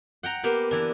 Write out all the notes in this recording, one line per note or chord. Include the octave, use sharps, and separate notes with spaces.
F#5 G5 A#5
A#3 B3 G4 A#4
E3 D4